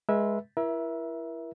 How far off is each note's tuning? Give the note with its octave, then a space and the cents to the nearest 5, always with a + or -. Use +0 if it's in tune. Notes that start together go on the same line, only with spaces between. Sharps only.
G#3 +0 B4 -30 E5 +0
E4 +20 A#4 +40 E5 +0